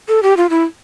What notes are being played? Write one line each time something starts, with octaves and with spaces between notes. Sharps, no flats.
A4
G4
F4
E4